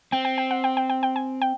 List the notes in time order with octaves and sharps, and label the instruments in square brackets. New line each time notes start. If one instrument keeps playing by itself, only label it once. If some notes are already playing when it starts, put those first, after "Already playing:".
[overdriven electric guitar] C4 [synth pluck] G5
[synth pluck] G5
G5
F#5
G5
G5
G5
G5
G#5
G5